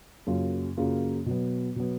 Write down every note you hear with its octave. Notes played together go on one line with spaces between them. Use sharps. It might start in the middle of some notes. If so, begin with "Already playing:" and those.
F#2 C#3 F#3 A#3 F4
F#2 C#3 F#3 A#3 F4
B2 F#3 B3
B2 F#3 B3